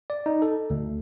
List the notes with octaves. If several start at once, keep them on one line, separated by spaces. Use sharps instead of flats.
D5
D#4
A4
D2